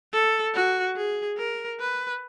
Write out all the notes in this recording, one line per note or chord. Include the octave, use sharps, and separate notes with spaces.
A4
F#4
G#4
A#4
B4